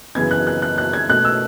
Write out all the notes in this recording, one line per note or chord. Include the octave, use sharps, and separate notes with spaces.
F#2 C#3 E3 B3 G#6
F#6
F#6
F#6
F#6
G#6
B2 A3 F#6
E6